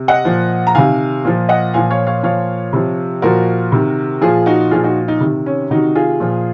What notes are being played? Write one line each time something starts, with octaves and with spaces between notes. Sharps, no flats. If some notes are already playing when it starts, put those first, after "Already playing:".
Already playing: C3
D#5 F#5
A#2 F3
A#5
C3 D#3 F5 G#5
A#2 F3
D#5 F#5
A#2 F3 F5 G#5
C#5 F5
C#5 F5
A#2 F3 C#5 F5
C3 F3
A#2 F3 F#4 A#4
C3 D#3
A#2 F3 F4 G#4
D#4 F#4
A#2 F3 F4 G#4
D#4 F#4
D#4
C3 D#3
C#4
C3 D#3 D#4 F#4
F4 G#4
A#2 F3